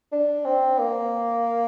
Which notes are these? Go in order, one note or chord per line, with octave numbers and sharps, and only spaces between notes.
D4
C4
A#3